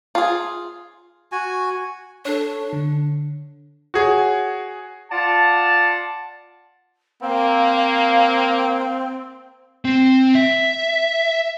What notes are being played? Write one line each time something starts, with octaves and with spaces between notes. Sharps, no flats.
F4 G#4
F#4 G#5
D4 A4 C#5
D3
F#4 G#4 C#5
F4 D5 F#5 A5
A#3 C4 F5
C4
E5